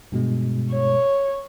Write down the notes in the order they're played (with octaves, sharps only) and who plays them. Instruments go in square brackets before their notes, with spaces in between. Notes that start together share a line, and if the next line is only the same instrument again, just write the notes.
[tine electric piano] G2 B2 G#3
[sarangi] C#5